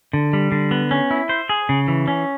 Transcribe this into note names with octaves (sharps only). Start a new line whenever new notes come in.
D3
G3
D3
B3
C#4
E4
C5
G#4
C#3
E3
C#4